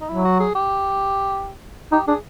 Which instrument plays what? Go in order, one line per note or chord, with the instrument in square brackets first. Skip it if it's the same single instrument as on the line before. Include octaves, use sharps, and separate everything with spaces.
[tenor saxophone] D#4
[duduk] F#3 [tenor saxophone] E4
[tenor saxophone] F#4
G#4
G4
[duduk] D#4 [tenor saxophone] G4
[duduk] D4 [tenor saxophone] G#4